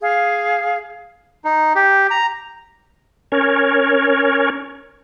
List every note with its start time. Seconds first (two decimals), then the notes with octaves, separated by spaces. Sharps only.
0.01 G#4 F5
1.44 D#4
1.75 G4
2.10 A#5
3.32 C#4 A#4 C#5